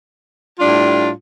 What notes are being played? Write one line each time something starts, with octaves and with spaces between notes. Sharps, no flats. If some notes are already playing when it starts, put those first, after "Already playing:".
A2 G3 D4 F4